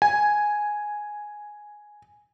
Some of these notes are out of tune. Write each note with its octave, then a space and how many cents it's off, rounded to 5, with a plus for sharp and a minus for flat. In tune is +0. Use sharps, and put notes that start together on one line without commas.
G#5 +0